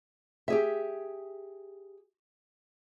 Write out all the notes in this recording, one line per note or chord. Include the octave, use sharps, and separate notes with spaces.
G4 G#4 E5